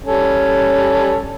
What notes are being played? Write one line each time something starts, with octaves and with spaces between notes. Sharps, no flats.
G3 C#4 A4